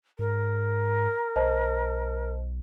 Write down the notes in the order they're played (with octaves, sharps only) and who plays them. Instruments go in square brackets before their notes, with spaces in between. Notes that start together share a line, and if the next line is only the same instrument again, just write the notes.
[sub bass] G#2 [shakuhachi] A#4
[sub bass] B1 [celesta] C5 D#5 A5